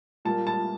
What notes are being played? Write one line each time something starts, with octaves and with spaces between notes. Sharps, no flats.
A#2 G3 A#3 A5
A5